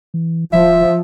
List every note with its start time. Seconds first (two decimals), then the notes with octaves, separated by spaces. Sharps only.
0.14 E3
0.53 D1 F3 E5